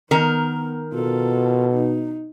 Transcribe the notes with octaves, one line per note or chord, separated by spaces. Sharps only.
D#3 B3 A#4
B2 F4 A4
D#4